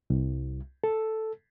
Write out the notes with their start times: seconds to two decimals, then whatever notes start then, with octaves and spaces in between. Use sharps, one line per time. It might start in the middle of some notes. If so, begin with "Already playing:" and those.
0.10 C2
0.84 A4